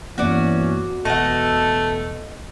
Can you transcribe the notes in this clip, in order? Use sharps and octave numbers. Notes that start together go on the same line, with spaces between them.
G2 E3 A#3 B3 C#4 F#4 D5
E1 B2 A3 A4 D#5 F#5